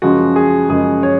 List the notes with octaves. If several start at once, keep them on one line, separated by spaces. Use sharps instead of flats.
F#2 C#3 F3 G#3 F#4
G#4
F#2 C#3 F3 G#3 G#4
C#5